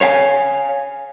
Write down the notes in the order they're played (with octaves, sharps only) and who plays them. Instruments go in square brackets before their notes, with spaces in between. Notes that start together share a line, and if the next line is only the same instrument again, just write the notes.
[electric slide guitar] C#5 F5 G5 G#5